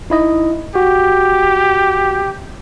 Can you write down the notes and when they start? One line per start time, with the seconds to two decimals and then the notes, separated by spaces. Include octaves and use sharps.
0.10 D#4 E4 D#5
0.75 F#4 G4